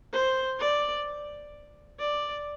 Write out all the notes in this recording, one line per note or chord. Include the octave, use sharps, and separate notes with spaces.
C5
D5
D5